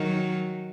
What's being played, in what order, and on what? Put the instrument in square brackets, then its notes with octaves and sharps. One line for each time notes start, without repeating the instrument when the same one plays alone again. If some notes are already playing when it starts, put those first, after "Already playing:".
Already playing: [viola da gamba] D#3 F#3